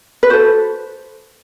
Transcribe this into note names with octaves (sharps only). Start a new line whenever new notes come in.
B4
F#4 A4 C5